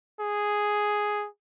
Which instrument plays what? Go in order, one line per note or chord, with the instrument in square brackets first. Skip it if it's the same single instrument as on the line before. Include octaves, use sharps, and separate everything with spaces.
[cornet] G#4